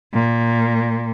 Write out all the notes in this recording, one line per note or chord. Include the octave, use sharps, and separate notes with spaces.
A#2